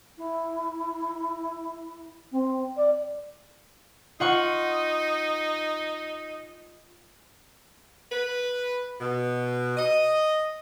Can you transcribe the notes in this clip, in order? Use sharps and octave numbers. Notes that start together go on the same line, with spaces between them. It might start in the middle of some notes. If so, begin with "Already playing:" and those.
E4
C4
D5
D#4 F4 F#5 C#6
B4
B2
D#5